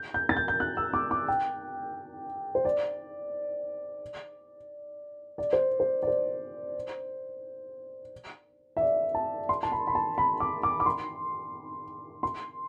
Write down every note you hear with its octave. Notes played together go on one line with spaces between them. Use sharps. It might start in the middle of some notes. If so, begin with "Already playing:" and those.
Already playing: G6
G6
A6
G6
G6
F#6
E6
D6
D6
G5
C5
D5
D5
C5
C5
D5
C5
E5
D5
A5
C6
A5
B5
B5
A5
B5
D6
D6
D6
C6
C6